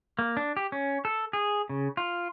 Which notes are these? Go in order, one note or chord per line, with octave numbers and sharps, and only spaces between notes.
A#3
D4
G4
C#4
A4
G#4
C#3
F4